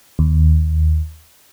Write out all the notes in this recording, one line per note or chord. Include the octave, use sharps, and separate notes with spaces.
D#2